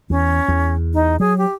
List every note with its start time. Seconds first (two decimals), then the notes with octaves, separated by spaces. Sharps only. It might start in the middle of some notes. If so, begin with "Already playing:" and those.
0.10 E2 C#4
0.48 E2
0.94 D#4
1.20 F#3 G#4
1.38 G4